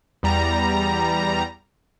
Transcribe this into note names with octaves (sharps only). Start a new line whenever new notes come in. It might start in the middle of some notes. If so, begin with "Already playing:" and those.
E2 G3 A#5